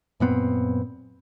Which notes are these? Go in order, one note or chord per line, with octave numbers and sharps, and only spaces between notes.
F#2 A#2 B3 C4